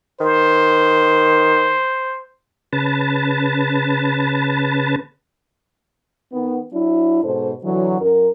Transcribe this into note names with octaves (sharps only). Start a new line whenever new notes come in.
D#3 C5
C#3 B4 A5
D#3 B3
F#3 D4 E4
G#2 B2 A4 C5
D3 E3 F#3
F#2 A#4